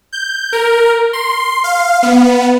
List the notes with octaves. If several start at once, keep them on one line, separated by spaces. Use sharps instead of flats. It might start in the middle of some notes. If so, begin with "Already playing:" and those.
G6
A#4
C6
F5
B3